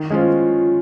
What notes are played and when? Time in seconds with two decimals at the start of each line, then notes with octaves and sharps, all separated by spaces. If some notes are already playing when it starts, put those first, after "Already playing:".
Already playing: D#3
0.10 G#3 C#4 F4 C5